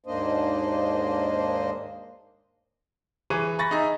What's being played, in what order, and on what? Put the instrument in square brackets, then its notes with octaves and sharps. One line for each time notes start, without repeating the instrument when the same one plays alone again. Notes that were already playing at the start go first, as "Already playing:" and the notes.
[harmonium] D#2 G#2 A#3 D4 C5 D#5
[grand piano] E3 G#4 C#6 D#7
B5 C#6 A6 A#6
D#4 G#4 D#5 E5